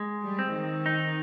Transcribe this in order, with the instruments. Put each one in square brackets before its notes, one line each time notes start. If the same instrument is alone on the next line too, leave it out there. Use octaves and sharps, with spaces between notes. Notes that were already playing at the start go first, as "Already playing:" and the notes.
Already playing: [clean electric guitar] G#3
[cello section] G3
[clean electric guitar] C4
[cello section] D#3
[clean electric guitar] D#4